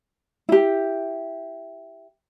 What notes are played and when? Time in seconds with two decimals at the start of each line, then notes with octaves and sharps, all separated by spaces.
0.49 E4 G4